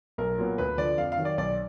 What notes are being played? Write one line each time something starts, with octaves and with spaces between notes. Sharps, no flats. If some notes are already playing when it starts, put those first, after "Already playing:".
B1 A#4
A#2 F#3 B3
D2 B4
D3 F3 D5
F2 F5
F5
D#3 F#3
D5
B1 D5